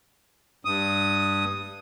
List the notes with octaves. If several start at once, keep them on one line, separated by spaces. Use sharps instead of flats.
G2 D#6